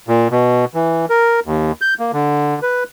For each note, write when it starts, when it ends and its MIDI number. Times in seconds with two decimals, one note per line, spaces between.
0.08 0.28 46
0.31 0.65 47
0.74 1.06 52
1.09 1.40 70
1.46 1.72 39
1.81 1.94 91
1.99 2.11 58
2.13 2.59 50
2.62 2.84 71